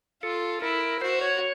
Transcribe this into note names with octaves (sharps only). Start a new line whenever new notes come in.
F4 A4
E4 A#4
F#4 C5
C#5